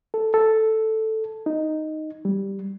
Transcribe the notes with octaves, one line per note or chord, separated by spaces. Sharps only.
A4
A4
D#4
G3